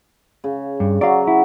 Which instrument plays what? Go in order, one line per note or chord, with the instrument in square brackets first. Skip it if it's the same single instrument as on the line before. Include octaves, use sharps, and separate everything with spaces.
[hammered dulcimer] C#3
[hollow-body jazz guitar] G2
[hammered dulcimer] F#3 F#4 [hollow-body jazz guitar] D5 F5
[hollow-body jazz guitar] E4